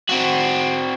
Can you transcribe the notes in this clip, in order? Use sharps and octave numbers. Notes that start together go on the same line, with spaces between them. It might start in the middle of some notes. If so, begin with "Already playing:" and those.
C4 F#4